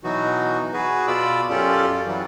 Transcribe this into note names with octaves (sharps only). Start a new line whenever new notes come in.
B2 E3 F#3 D#4 F#4
F#4 G#4 B4
B2 F4 D5 B5 D6 E6
F#2 C#4 F4 G4 A4 D5
E3 F#3 G3